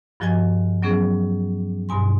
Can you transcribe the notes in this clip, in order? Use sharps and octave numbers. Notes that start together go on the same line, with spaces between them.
G2 F3 F#4 D#5 G#5 G#6
F#3 B3 C#4 G#4
G2 B2 G#5 C6